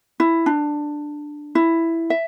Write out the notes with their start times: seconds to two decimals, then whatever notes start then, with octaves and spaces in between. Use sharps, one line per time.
0.20 E4
0.46 D4
1.55 E4
2.10 E5